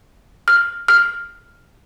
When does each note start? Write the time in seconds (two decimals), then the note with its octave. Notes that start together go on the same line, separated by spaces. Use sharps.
0.48 F6
0.88 F6